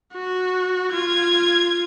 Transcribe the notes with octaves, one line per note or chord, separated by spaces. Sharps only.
F#4
F4 G#6